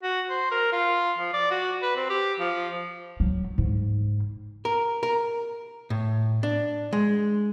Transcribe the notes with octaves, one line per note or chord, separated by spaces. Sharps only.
F#4
C5
A#4
F4
F3
D5
F#4
B4
C4
G4
F3
F#3
G#2
A#4
A#4
A2
D4
G#3